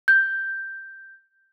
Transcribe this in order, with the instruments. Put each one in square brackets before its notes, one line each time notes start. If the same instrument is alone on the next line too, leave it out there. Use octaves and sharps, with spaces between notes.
[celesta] G6